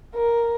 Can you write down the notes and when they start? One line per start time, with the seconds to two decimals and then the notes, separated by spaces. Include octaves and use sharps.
0.15 A#4